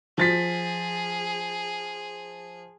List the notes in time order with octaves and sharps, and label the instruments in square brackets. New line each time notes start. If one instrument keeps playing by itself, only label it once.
[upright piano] F3 A6 B6 [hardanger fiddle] G#4